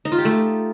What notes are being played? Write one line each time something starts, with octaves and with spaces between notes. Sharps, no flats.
D#4
F4
G4
A3